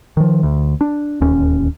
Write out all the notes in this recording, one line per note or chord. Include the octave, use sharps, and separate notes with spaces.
D#3 F3
D2
D4
D1 D#2 C#4